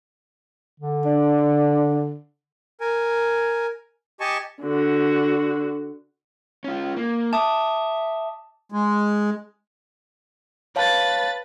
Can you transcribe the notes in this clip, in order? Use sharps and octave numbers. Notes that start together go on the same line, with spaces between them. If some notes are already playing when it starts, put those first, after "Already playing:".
D3
D4
A#4 G#5
G4 D#5 G#5 A5 C#6
D3 F#4
C#4 F4
A#3
E5 A5 D6 D#6
G#3
B4 C#5 F5 A5 A6